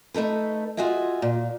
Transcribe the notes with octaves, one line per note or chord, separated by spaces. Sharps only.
A3 D#4 A4 B4
F4 F#4 G#4 D#5 E5
A#2